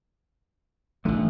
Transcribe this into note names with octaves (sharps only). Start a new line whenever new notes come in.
A1 D3 D#3 F3 A3